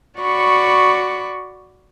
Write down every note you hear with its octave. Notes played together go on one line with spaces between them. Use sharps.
F#4 D5 B5 C#6